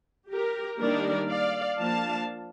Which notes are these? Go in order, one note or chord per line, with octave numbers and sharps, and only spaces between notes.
G4 A#4
D#3 G3 A#3 D4 A#4 D5
D5 F5
F3 A#3 D4 F5 A5